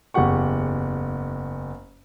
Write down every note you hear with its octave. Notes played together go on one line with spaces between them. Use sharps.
F#1 E2 G4 F#5 C#6